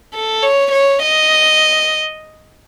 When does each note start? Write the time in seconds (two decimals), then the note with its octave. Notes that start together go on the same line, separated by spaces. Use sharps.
0.14 A4
0.43 C#5
0.72 C#5
1.02 D#5